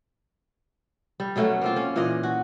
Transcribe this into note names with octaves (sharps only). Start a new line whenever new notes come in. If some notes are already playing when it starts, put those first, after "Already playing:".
G3
B2 F#3 A3 C#4
A#3 C4 F4
C#4
A#2 E3 A#4 D#5
F#4